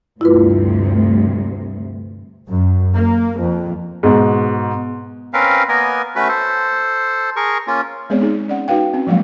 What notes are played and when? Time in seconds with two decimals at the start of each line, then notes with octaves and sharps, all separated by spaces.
0.21 D2 G2 C3 E4 F4 B4
2.48 F#2
2.95 A#3
3.40 F2
4.03 G#2 B2
5.33 C4 C#4 A#4 B4 F5
5.68 A#3 B3 A#4 D#5 G#5
6.16 A3 C#4 F#4 B4
6.28 A4 C5
7.36 G#4 A#4 C#6
7.67 A#3 C#4 F4
8.10 G#3 B3 C4 G#4 C#5 D5
8.21 D#4 G#4
8.48 C#4 D5 F#5
8.68 D#4 F#4 B4 F5 G5
8.94 C4 C#4
9.07 F3 F#3 G#3 A#3 F5